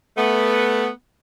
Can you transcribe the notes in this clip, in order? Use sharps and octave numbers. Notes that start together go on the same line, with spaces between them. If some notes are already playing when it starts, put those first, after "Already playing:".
A3 B3